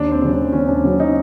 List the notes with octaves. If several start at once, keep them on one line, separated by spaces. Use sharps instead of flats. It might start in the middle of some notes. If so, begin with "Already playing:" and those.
Already playing: D#2 D4
C4
C#3 F#3
C4
D#2 C#4
D4
C#3 F#3
D#4